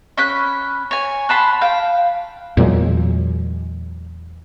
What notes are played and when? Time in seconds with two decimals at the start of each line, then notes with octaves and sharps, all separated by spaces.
0.17 C#4 B5 F#6
0.91 C#5 G#5
1.29 F#5 A5 B5 C6
1.61 F5 G5
2.57 E2 A#2 F#3 G#3